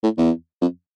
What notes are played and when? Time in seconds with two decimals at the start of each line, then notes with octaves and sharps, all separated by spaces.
0.03 A2
0.17 E2
0.61 F2